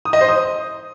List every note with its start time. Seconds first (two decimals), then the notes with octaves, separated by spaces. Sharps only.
0.05 D#6
0.13 D#5
0.21 C5
0.29 D#6